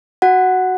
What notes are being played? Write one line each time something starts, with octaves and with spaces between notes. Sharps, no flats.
F#4 F#5